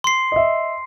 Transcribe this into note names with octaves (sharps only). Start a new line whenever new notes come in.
C6 C7
D#5 E5